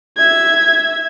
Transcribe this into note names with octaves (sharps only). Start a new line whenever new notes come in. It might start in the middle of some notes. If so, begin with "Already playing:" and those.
E5 G#6